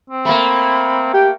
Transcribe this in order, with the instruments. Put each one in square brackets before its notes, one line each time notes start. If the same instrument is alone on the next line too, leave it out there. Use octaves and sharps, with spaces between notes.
[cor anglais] C4
[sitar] A3 A#3 [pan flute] B5
[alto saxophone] G4 [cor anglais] G5